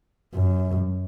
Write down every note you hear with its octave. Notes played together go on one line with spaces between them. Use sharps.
F#2